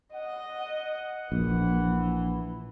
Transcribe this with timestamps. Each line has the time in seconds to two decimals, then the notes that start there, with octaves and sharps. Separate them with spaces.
0.14 D#5 F#5
0.60 F#5
1.32 A#1 E3